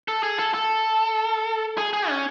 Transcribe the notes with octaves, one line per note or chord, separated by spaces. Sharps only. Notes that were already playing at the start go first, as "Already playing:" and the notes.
A4
G#4
A4
A4
G#4
G#4
C#4